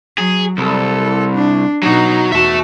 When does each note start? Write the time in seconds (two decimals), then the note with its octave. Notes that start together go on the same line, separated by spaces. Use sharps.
0.18 F#3 G#4
0.58 C2 A4
1.34 D4
1.83 B2 F#3 D#4 F#4
2.32 E2 F#4 E5 A5